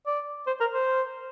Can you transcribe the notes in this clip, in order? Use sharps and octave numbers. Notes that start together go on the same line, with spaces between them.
D5
C5
A#4
C5